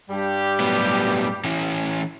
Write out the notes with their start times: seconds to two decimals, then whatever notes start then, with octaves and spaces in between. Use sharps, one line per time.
0.10 G2 G3 G4
0.60 A2 F#3 B3
1.44 E3 C#4 E4